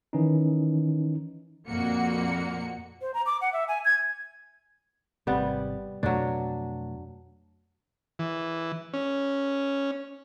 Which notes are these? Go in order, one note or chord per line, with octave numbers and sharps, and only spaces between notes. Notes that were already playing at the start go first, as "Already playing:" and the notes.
D#3 E3 C#4 D#4
F2 A#2 A#3 F#4 C#7
C5
A#5
D6
F#5
E5
G#5
G#6
G#1 C3 G3 B3
F2 B2 F#3 A3 D4
E3
C#4